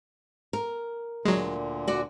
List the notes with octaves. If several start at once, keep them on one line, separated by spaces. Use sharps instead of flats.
A#4
D2 A#2 D3 F#3 G#3
F#4 D5